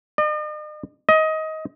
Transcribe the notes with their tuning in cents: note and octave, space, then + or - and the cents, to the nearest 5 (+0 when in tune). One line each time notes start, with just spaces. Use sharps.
D#5 -45
D#5 +20